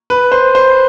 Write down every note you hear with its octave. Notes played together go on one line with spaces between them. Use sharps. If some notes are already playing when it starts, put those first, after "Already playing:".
B4
C5
C5